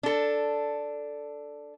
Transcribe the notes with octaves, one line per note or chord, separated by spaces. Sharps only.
D4 A4